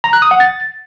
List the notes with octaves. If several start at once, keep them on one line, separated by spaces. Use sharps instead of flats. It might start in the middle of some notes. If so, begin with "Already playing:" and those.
A#5
F#6
D#6
F#5
A6